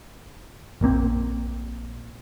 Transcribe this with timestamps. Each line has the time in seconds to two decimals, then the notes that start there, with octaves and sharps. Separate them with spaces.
0.81 A#1 A#2 A#3 C4